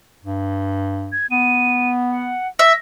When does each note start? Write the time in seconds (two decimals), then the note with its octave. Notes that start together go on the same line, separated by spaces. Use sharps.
0.24 G2
1.12 G#6
1.31 B3 D#7
2.11 F#5
2.59 E5 A#6